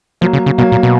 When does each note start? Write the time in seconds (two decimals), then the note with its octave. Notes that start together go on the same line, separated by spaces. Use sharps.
0.21 F3 F#3 A#3
0.33 C#3
0.46 C#3
0.58 B2 F#3 A#3
0.72 A#2
0.83 B2